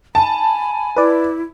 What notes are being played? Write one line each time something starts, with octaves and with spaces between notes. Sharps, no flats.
G#5 A5 B5
E4 B4 D5